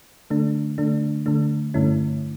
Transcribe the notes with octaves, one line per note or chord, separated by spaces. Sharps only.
D3 A3 D4
D3 A3 D4
D3 A3 D4
G2 D3 A3 C#4 E4